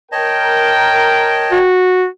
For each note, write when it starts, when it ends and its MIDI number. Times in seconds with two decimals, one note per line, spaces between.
0.12 1.73 70
0.12 1.59 73
0.12 1.59 75
0.12 1.73 79
0.12 1.59 81
1.52 2.06 66